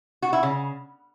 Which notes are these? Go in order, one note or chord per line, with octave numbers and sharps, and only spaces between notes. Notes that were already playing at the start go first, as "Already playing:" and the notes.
F#4
E4
C#3